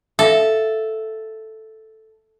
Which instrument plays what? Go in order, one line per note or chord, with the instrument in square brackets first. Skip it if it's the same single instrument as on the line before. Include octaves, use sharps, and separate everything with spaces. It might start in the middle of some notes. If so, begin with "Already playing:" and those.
[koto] A4 [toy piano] E5 F5